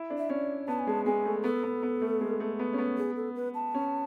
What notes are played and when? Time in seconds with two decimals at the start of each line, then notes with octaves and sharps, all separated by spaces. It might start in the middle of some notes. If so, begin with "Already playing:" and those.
Already playing: E4
0.10 D4
0.18 E5
0.29 C#4 D5
0.68 B3 A5
0.79 G#5
0.87 G#3 A5
1.06 G#3 G#5
1.25 A3
1.44 B3 A4
1.63 B3
1.83 B3
2.02 A3
2.21 G#3
2.40 A3
2.59 B3
2.73 C#4
2.78 B3
2.98 G#4
3.16 A4
3.35 B4
3.54 A5
3.74 C#4